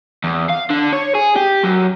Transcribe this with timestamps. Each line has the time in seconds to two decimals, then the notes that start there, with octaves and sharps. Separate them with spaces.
0.24 E2
0.50 F5
0.70 D3
0.93 C#5
1.15 G#4
1.36 G4
1.63 F#2